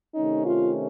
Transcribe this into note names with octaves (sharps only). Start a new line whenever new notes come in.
C3 D#3 A3 C#4 D#4
F4